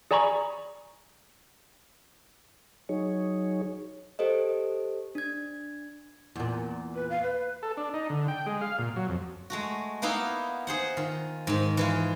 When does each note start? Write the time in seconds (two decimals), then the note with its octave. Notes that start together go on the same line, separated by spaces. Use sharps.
0.11 G#4 D5 G#5 A#5 B5 C#6
2.89 F#3 D#4 G#4 C#5
4.19 G4 A4 C5 D#5
5.15 D4 G#6
6.35 E2 A#2
6.95 B4
7.10 F5
7.23 B4
7.63 A4
7.77 D4
7.94 D#4
8.10 D3
8.28 G5
8.46 G#3
8.61 F5
8.79 A#2
8.96 F#3
9.09 F2
9.50 G#3 A3 F#4
10.02 A#3 B3 D#4 E4 F5 F#5
10.67 D#4 G#4 C5 F#5
10.97 D#3 F4
11.47 G#2 D#3
11.77 E3 G#3 F4